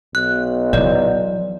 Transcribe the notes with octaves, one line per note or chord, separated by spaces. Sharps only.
B1 F#6
E3 F#3 D5